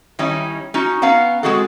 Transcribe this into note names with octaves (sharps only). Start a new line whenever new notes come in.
D#3 G3 C#4 D#4 E4
C#4 D#4 F#4
B3 C#4 F5 F#5 A#5
G#3 A#3 C4 F#4 G#4 A4